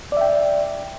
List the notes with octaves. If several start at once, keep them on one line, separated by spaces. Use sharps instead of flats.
D5 E5 G5